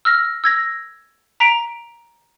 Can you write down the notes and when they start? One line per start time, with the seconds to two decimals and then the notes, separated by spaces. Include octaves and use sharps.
0.05 E6 F6 A#6
0.44 E6 G#6 A#6
1.40 A#5 B6 D7 F7